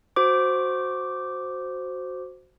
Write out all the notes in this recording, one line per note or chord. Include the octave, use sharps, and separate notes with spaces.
F#4 C5 D6